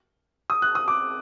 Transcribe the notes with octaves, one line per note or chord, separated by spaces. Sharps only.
D#6
F#6
D#6
D6